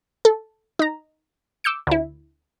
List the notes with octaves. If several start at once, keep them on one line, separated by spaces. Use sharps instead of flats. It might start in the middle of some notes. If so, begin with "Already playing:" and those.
A4
D#4 A#5
D6 E6 G6 C#7
D2 E4